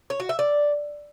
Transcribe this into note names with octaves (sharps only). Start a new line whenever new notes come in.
C#5
F#4
E5
D5